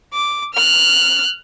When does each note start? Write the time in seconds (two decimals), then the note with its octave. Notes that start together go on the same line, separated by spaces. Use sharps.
0.13 D6
0.54 F6 F#6